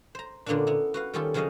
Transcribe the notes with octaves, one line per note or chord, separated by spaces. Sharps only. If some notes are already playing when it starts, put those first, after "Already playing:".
C5 A#5
A#2 D3 A#3 B3 C#4 D4
B3 E4
F#4 B4 F5
D#3 G3 C#4 F4 G4 A4
C#3 F3 F#3 C#4 D#5 F5